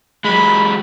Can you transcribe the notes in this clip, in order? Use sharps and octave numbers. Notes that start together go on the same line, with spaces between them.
F#3 G#3 B5